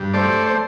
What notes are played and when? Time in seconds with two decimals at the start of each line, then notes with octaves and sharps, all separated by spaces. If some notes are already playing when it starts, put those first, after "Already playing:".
Already playing: G2
0.13 A3 C5 D5
0.46 C5